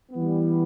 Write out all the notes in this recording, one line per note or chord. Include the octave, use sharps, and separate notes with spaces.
E3 G3 B3